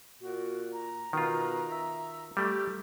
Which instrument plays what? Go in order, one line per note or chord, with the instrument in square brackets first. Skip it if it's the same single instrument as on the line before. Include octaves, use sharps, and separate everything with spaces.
[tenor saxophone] A#2 [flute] F#4
[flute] A#5
[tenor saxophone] B2 [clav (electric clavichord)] D#3 F4
[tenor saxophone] E5
[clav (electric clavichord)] G3 A3 [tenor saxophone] G4